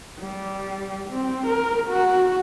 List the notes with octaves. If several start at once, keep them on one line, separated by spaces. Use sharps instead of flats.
G3
C4
A#4
F#4